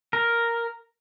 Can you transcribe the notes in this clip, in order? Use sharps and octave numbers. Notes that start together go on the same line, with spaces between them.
A#4